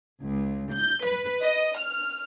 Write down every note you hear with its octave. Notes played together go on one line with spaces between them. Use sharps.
C#2
G6
B4
D#5
F6